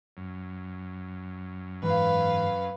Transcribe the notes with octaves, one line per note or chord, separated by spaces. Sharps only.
F#2
G#2 E3 B4 F5